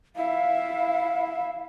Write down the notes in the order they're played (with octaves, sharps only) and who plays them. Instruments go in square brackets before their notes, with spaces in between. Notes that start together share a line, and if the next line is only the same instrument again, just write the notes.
[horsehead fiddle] E4 E5 [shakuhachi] F5